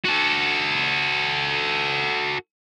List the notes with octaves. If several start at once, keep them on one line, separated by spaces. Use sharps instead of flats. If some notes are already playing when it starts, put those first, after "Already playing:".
F#4 A4